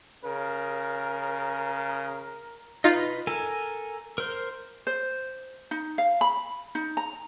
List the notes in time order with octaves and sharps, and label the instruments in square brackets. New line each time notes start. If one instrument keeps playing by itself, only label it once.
[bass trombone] C#3 [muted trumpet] A#4
[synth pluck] D#4 F4 [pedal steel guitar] B4 D#5
[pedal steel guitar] A4 A#4 G#5
A#4 C5
[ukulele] C5
D#4
F5
B5
D#4
A#5